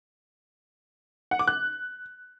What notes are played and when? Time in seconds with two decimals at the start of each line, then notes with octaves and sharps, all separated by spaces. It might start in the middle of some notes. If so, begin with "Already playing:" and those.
1.31 F#5
1.39 D6
1.48 F#6